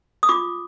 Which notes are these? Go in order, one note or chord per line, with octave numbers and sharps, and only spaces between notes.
D#6
F4 D6